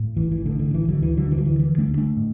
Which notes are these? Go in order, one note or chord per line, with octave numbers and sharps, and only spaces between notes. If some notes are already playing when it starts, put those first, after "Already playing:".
Already playing: A2
A1 E3
E3
A2 D3
D3
A1 E3
D3 F#3
D2 E3
D3 F#3
D3 E3
F#3
E3
D3 E3
A3 D4
D2
A3 D4
A2